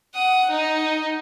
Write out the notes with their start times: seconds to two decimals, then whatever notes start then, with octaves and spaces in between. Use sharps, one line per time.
0.15 F#5 D#6
0.50 D#4